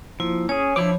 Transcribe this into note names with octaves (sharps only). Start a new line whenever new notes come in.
F3 A#3 E4
C#4 G#4 C#5
F3 D4 E4 D6